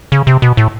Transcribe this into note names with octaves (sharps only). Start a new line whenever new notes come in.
C#3
C3
B2
A2